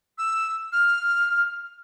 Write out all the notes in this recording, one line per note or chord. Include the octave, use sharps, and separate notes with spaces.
E6
F6